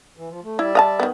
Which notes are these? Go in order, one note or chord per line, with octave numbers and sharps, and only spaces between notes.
E3
F3
A3
G3 E4 D5 E5
D#5 F5 A5
D#3 B3